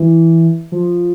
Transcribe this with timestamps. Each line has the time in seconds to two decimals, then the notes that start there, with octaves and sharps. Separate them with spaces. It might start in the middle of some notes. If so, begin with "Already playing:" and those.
Already playing: E3
0.72 F3